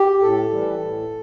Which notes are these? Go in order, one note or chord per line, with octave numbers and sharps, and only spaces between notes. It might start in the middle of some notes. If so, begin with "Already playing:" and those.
Already playing: G4
A2 A4
E3 G3
A2